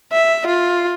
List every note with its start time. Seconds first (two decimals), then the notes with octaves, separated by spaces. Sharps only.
0.13 E5
0.47 F4